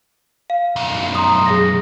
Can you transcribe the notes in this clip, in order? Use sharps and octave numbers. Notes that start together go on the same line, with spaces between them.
F5
B1 F#2
A#5 C6 D#6
G#4 A#6